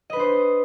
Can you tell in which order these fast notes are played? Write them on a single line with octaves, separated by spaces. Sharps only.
D#5 B4 D4 C5